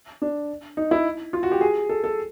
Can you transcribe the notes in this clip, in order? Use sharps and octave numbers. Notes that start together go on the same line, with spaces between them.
D4
D#4
E4
F4
F#4
G4
G#4
A4
A4